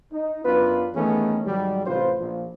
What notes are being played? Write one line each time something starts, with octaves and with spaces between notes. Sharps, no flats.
D#4
F#2 B3 D4 F4 B4
D#3 E3 A3 B3 C#4 G#4
G#2 D#3 F#3 G3
A1 C3 F4 B4 C5
A#1 F3